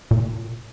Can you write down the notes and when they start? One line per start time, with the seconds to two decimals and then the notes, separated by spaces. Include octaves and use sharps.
0.11 A#2